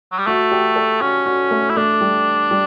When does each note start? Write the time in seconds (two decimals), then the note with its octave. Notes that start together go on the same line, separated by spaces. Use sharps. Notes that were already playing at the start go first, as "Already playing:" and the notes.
0.12 F#3
0.19 G3
0.26 A3 F#4
0.52 G4
0.76 A4
1.01 C#4 F#4
1.26 F#4
1.51 A3
1.70 E4
1.77 A3 D4
2.01 G3
2.51 G3